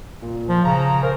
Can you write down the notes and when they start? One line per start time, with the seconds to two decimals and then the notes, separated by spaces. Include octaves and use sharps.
0.22 A#2
0.49 F3
0.65 C#3 A#5
1.03 A#4 C5